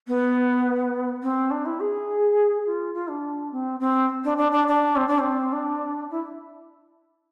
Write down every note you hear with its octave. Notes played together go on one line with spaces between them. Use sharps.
B3
C4
D4
E4
G#4
F4
F4
D4
C4
C4
D4
D4
D4
D4
C4
D4
C4
D4
E4